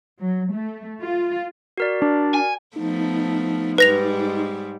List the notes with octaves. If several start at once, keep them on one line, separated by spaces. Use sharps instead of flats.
F#3
A3
F4
F#4 A#4 D5
D4
G#5
F3 A3 B3 D#4
G#2 G3 G#3 B4 A#6 F7